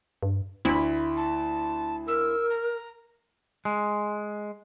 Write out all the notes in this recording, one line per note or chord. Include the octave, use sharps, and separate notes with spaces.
G2
D2 E4 B5
A5
A#4 E6
A#5
G#3